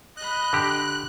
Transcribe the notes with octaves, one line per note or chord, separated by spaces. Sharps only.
D#5 B5 F#6
D3 G4